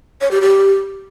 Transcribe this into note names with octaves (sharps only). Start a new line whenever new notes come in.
C#5
G4
G4